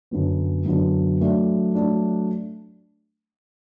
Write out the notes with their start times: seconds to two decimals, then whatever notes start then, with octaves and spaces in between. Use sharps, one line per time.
0.11 F#2 D3 F#3 B3
0.66 F#2 D3 F#3 B3
1.20 F#3 A3 D4
1.75 F#3 A3 D4